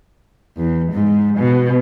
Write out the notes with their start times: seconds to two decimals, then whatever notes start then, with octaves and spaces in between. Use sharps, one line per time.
0.57 E2
0.93 G#2
1.38 B2